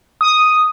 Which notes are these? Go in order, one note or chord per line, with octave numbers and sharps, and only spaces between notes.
D#6